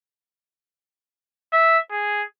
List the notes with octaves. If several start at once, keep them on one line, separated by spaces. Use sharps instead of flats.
E5
G#4